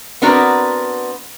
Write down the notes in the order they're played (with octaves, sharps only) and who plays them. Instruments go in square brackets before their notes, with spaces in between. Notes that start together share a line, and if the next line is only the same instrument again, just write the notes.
[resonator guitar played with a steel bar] B3 C4 D4 F#4 A#4 B4